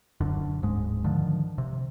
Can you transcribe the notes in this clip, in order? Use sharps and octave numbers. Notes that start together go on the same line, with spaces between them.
E1 F#2 D3
D1 G#2 G#3
D3 D#3 F3
C3